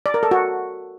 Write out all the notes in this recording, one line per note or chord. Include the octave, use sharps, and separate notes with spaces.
D5
A#4
A4
F#4